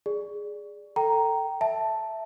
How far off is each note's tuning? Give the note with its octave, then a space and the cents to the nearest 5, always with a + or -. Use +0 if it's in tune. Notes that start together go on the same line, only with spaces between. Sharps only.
G#4 +0 D5 +0
A4 +15 G5 -15 A#5 +0
E5 +0 A5 +0